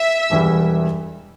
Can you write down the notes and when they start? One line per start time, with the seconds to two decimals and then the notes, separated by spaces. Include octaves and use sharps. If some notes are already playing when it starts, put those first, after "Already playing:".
Already playing: E5
0.30 E1 E2 E3 G3 E4